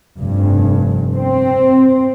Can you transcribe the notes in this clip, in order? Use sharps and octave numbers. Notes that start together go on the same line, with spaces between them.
F1 G2
C4